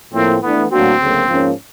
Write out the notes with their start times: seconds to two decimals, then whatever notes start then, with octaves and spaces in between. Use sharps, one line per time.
0.14 A2 F3 A#3 C4
0.42 E3 A3 B3 D4
0.71 A2 F#3 A#3 C4 D4 F#4
1.00 D2 C#3 F#3 A#3
1.28 G#2 F3 A#3 C#4